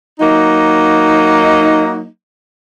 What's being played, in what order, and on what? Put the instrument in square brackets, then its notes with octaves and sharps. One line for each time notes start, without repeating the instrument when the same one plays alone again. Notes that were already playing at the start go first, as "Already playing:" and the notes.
[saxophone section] F#3 A#3 D#4